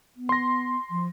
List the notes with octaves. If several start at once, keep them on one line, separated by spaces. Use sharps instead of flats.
B3
C6 A#6
F3